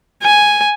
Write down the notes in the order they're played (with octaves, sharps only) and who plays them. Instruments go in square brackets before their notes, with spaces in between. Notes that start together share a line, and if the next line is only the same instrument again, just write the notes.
[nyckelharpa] G#5